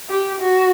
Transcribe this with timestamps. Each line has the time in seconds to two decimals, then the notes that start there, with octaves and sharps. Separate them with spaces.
0.10 G4
0.40 F#4